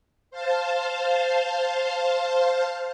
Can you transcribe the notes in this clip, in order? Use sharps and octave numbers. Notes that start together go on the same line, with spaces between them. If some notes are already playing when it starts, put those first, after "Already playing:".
C5 F5 A5